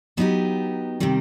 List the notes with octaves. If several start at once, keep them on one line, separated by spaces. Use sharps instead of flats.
F#3 B3 D#4 G4
C3 D#3 G3